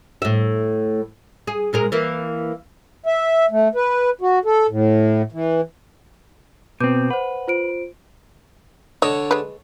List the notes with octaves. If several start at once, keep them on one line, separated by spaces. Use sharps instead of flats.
A2 E5
G#4
A#2 G#3 A#4
E3 A#3
E5
A3
B4
F#4
A4
A2
E3
B2 C4 B4 D6 G6
B4 C5 F#5
F4 C5 D7
D3 C#5 D#5
G#3 B4